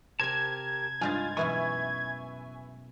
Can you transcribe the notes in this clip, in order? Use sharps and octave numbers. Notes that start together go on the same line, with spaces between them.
C3 G4 A#4 G#5 A5 G#6
G2 G#3 D#4 F4 G#5 G6 A6
F#2 B2 E3 B4 E5 G#5 C#6